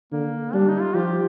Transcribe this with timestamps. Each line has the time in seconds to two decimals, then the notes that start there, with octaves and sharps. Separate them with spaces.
0.12 D3 A#3
0.54 G3 D4
0.68 D#4
0.82 F4
0.95 F3 G4